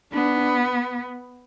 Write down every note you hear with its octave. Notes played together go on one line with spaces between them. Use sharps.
B3 D4